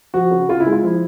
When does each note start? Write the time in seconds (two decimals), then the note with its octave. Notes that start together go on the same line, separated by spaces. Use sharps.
0.14 F3 F#4
0.31 C#3
0.49 C#3 F4
0.60 E4
0.66 G#3
0.72 F4
0.83 F3 E4